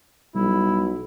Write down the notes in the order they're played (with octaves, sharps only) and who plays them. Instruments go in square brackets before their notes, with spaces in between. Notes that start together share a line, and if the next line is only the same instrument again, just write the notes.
[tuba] B1 [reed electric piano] G3 [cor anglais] E4